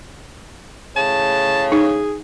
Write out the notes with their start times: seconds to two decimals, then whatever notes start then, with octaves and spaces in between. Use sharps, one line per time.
0.96 A2 C#3 A5
1.72 D#4 G#4